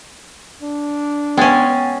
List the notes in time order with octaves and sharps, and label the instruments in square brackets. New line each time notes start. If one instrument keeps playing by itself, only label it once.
[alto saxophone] D4
[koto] G#3 C#4 [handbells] B3 F#5 A6 [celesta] G5